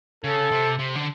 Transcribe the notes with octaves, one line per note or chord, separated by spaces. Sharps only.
C#3 A4
C3
C3
D3